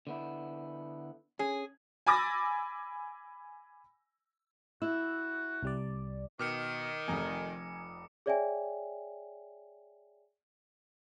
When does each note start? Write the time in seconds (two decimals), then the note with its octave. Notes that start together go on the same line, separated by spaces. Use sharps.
0.07 D3 B3 E4
1.39 C#4 G#4
2.07 G#5 B5 D6 E6 A6 A#6
4.82 E4 F#4 E6
5.63 C2 G3 D5
6.39 B2 D#3 D6 F6 C#7
7.08 F1 F2 G#5 A#5
8.26 G#4 C#5 D5 E5 G5 G#5